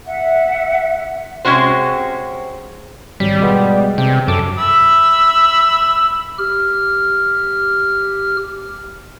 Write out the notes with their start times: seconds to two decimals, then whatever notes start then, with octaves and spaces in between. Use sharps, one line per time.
0.06 E5 F#5
1.45 C3 G#3 C#4 F#4 C5
3.20 G#1 F#3 G3 B6
3.40 B2 G#3 B3
3.98 C3 G5
4.28 F#2 A4 A5 D6
4.58 E5 B5 E6
6.38 G4 F6